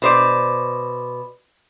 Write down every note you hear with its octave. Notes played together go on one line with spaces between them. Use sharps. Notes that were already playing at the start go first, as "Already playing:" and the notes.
B2 C5 D5